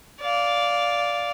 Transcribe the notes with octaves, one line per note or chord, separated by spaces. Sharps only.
D5 F5